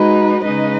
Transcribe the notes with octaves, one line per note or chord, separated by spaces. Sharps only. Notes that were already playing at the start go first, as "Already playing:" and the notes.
Already playing: G#3 D#4 F#4 B4
C#3 G#3 D#4 B4 D#5